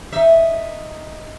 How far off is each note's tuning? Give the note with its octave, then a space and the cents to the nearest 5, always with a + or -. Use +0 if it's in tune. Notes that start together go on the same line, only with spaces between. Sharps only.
D#4 +0 E5 +0